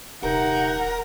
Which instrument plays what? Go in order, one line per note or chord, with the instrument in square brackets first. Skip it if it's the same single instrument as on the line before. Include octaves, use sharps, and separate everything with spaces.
[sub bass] D#1 [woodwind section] C3 D#4 [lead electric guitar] A#4 [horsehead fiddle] F#5